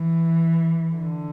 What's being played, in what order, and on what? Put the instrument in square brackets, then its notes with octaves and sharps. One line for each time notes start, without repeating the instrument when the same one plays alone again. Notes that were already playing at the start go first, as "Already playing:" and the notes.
Already playing: [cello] E3
D3